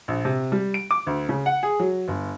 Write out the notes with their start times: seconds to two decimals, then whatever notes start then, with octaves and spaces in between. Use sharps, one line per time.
0.08 A#1
0.25 C3
0.52 G3
0.74 D7
0.91 D6
1.07 D2
1.29 C#3
1.46 F#5
1.63 G#4
1.80 F#3
2.08 G1